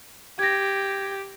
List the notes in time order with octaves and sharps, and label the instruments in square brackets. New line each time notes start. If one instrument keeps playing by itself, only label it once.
[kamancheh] G4 [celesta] G#6 A#6